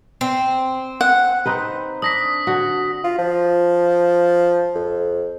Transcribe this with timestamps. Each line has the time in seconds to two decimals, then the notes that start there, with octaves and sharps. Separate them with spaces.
0.21 C4
1.01 F#5
1.46 C4 D#4 B4
2.02 D4 D#6 A#6 B6
2.47 D3 F#4
3.04 F4
3.18 F3
4.75 F2